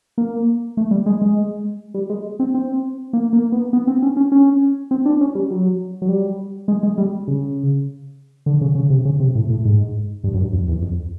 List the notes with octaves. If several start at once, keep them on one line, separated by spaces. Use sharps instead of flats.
A#3
A3
G3
G#3
G#3
G3
G#3
C4
C4
A#3
A#3
B3
B3
C4
C#4
C#4
C#4
C4
D4
C#4
G3
F#3
F#3
G3
G#3
G#3
G3
C#3
D3
C#3
C#3
C3
C#3
C3
A2
A2
G#2
G2
F#2
G2
F2
E2
F2